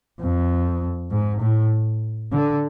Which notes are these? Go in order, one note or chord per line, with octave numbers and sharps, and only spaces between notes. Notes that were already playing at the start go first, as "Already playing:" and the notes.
F2
G#2
A2
D3